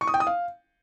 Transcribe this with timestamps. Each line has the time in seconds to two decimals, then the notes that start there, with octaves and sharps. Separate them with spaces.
0.01 C#6
0.07 D#6
0.14 G5
0.20 D#6
0.27 F5